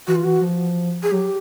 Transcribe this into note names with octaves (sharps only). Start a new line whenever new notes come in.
E3 F#4
F4
E3 F#4
F3
G#4
F#3 G4